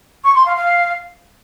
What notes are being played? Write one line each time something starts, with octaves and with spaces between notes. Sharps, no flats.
C#6
C6
F5
F5